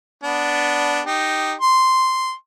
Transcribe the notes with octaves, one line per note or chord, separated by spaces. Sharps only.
B3 D4
D#4 G4
C6